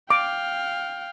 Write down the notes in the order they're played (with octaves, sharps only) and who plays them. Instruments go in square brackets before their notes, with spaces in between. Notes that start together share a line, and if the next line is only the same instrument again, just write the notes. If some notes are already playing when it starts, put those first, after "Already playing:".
[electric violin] F5 G5 [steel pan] D6